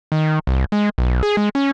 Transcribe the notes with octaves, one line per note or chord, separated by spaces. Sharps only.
D#3
C2
G#3
B1
G#4
G#3
C#4